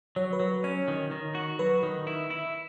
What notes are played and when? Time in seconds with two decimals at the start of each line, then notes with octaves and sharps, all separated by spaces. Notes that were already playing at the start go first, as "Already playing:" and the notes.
0.16 F#3 C#5
0.33 B4
0.40 F#3
0.48 B4
0.64 C#4 C#5
0.88 D#3
1.11 D#3
1.35 F#4
1.59 F#3 B4
1.83 D#3
2.07 E4
2.30 E4